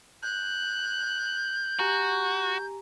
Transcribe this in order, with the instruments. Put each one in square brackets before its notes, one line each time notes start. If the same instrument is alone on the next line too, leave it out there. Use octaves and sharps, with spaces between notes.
[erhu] F#6 [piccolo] G6
[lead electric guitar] F#4 [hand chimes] G4 G#5 A#5